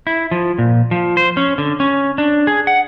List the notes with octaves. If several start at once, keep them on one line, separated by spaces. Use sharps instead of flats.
E4
F3
A#2
F3
C5
C#4
D3
C#4
D4
G#4
F#5